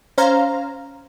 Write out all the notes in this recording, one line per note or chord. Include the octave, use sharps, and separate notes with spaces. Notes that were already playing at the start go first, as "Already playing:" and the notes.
C#4 C5 F5 A#5